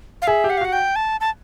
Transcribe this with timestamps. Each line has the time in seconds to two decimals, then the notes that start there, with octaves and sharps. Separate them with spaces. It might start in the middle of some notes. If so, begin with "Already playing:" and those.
0.22 F5
0.27 G#4 E5
0.44 G4
0.50 F#5
0.58 F5
0.61 F#4 F#5
0.73 G5
0.96 A5
1.21 A5